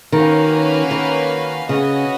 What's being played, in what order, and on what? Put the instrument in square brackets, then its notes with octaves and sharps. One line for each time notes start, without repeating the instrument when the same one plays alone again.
[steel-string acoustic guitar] D#3 [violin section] A#3 C#4 F#4 B4 F5
[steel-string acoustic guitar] D#3
[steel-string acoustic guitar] C#3 [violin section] C#4 F#4 B4 D#5